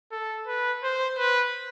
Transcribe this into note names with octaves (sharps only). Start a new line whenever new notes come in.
A4
B4
C5
B4